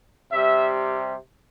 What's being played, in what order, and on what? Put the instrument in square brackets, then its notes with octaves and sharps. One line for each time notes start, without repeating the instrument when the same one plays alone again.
[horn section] C3 G3 E5